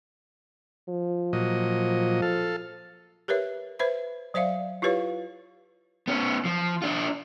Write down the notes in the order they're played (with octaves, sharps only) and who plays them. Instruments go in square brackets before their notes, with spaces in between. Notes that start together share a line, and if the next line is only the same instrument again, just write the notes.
[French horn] F3
[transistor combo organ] A#2 F#3 D#5
A4 F5
[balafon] G4 A#4 B4 C#5 E5
B4 C5 E5 B5
F#3 C5 D5 E5 F5
E4 F4 G4 B4 C#5 F5
[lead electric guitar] B3 C#4
F3
D4 F4